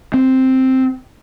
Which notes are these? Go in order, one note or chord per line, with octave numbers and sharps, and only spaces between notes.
C4